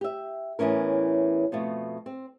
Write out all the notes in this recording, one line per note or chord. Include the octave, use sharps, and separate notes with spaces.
G4 E5
E2 A2 E3 C#4 A#4
F2 B2 A3
C4